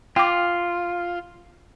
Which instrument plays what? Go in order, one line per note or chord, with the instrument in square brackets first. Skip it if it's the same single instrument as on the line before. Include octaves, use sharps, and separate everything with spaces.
[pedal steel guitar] F4 [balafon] G5 D6